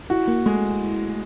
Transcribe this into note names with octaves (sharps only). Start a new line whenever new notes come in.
E4 F#4
A#3
G#3 A3